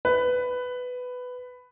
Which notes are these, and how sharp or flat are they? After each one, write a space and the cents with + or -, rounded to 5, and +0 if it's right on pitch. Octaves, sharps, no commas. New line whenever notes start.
B4 +10